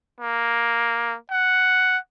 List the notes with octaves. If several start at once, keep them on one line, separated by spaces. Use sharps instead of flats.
A#3
F#5